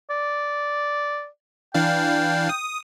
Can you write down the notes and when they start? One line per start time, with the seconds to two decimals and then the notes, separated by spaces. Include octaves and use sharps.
0.10 D5
1.74 E3 D4 F5 G5
2.49 D#6